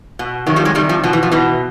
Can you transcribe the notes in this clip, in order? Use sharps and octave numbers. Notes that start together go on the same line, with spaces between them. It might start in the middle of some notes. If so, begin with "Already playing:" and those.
B2
C3 D#3 F#3
F3 G3
F#3 G#3
C3 D#3 G3 A3
F3 G3
B2 F3
E3
F3
B2 E3